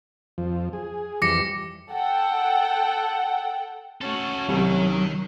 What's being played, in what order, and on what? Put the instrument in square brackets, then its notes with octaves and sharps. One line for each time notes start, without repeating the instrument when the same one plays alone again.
[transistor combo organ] F2 F3
G#4
[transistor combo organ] F2 E3 G3 [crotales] D6 A#6 C#7
[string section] A4 F#5 G5
[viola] A3 C#4 [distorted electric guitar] F#4 A4
[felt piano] C2 [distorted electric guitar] D#3 [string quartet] F#3